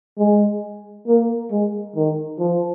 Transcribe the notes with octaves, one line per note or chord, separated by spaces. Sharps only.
G#3
A#3
G#3
D#3
F3